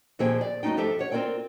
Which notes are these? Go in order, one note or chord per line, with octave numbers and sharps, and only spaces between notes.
D#2 A#2 F3 C4 G#4 G5
D5
F#2 G3 A3 D#4 G5
G2 F3 G4 A4 E5
C#5 F#5
C4 F4 A#4 D5 G5